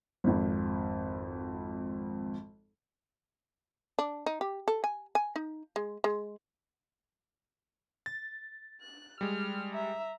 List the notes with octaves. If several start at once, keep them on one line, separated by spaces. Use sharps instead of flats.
G#1 F2
D4
D#4
G4
A4
G#5
G#5
D#4
G#3
G#3
A6
F#6
G3 G#3 F6
E5 A#5